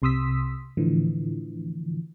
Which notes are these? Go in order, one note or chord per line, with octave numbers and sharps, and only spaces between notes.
C2 C3 C6 D#6 E6 B6
A2 D3 E3 F3